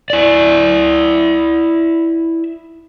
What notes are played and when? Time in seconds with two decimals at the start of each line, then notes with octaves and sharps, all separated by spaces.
0.10 E4 D5